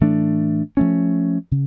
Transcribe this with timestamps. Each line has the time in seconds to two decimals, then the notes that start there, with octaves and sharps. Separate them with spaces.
0.01 A2 E3 A3 D4
0.77 F3 A3 C#4
1.51 C#3